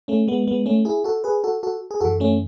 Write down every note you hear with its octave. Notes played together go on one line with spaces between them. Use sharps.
A3 C#4
G#3 B3
G#3 B3
A3 C#4
E4 G#4
F#4 A4
G#4 B4
F#4 A4
F#4 A4
G#4
F#2 E3 F#4 A4
A3 C#4